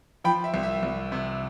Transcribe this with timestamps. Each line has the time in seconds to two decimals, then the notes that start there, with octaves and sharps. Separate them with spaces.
0.24 F3 G5 B5
0.44 E5
0.54 C2
0.63 E5
0.83 C2
1.12 C3